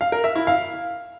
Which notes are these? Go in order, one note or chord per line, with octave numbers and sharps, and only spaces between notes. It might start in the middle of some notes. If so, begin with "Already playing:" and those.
F5
A#4
E5
E4
F5